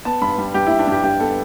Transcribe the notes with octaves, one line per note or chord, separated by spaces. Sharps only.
B3 A5
G2 B5
G3
G2 G4
E4
G3
D4
G2 G4
G2 G4
B3 A4